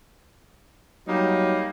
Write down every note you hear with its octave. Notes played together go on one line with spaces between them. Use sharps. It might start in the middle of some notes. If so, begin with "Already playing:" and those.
F#3 G3 A#3 D#4